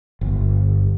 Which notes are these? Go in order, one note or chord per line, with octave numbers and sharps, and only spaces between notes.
G1